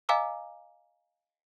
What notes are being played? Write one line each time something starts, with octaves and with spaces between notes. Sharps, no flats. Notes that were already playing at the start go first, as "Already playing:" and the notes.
D#5 F5 G#5 A#5 D6 E6